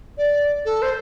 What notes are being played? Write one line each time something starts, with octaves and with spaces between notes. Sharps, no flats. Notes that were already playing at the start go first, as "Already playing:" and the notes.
D5
A4
C5